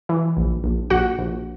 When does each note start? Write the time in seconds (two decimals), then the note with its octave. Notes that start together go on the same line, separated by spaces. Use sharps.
0.09 E3
0.37 A#1
0.64 A#1
0.90 A#1 F#4 F#5
1.19 A#1